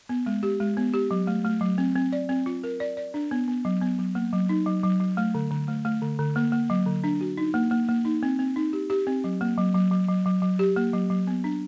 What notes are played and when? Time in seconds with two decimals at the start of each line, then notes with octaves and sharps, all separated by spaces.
0.09 B3
0.26 G#3
0.43 G4
0.60 G#3
0.77 B3
0.94 G4
1.11 F#3
1.27 A3
1.44 A3
1.61 F#3
1.78 C4
1.95 C4
2.13 D5
2.29 C4
2.46 F4
2.64 A#4
2.80 D5
2.97 D5
3.14 D4
3.31 B3
3.48 B3
3.65 F#3
3.81 B3
3.99 F#3
4.15 A#3
4.33 F#3
4.49 D#4
4.66 F#3
4.83 F#3
5.00 F#3
5.17 A3
5.35 D3
5.51 D3
5.68 A3
5.85 A3
6.02 D3
6.19 D3
6.36 A#3
6.52 A#3
6.70 F#3
6.86 D3
7.04 D4
7.21 F#4
7.38 D#4
7.54 A#3
7.71 A#3
7.88 A#3
8.05 D#4
8.23 C4
8.39 C4
8.56 D#4
8.73 G4
8.90 G4
9.07 C4
9.24 F#3
9.41 A#3
9.58 F#3
9.74 F#3
9.91 F#3
10.09 F#3
10.26 F#3
10.42 F#3
10.59 G4
10.76 A#3
10.93 F#3
11.10 F#3
11.27 B3
11.44 D4